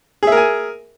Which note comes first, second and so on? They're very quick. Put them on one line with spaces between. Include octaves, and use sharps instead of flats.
G#4 E5 A#4 G#5